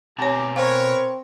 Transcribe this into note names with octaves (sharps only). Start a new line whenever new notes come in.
B2 C4 G4 C#5 G#5 A#5
C4 A#4 B4 C#5 F5